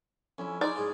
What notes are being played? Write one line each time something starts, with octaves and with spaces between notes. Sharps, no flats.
F2 C#4 E4 E5
D#4 G#4 C5 D5
G#2 F4 G#4